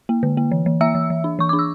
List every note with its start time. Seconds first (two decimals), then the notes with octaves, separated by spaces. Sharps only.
0.09 A#3
0.23 D3
0.37 A#3
0.52 E3
0.66 E3
0.81 A#3 E5 E6
0.95 E3
1.10 E3
1.24 D4
1.39 E3 C#6
1.49 D4 D6
1.59 E6